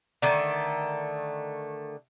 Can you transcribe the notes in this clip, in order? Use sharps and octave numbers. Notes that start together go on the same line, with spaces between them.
D3 D#3 A3